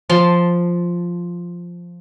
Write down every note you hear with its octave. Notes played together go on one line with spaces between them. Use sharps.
F3 A5 C6